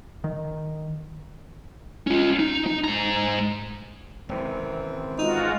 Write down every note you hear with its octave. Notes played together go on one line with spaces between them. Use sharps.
D#3
C#4 F4
D#4
D#4
G#2 A#5
G#1 F#2 C3 E3 C4
G#3 D#4 F4 F#4